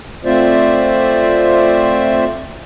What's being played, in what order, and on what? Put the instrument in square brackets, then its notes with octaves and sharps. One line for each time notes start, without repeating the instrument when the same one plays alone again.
[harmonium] A3 C4 F4 C5 D5 E5